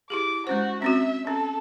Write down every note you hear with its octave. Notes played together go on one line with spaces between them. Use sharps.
E4 G4 G#4 D6
G#3 C#4 F#4 C5
C4 C#4 F#4 E5
C#4 A4